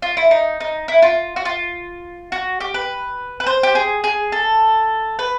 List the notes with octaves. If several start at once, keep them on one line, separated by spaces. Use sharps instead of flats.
F4
E4
D#4
D#4
E4
F4
F#4
F4
F#4
G4
B4
B4
C5
G4
G#4
G#4
A4
B4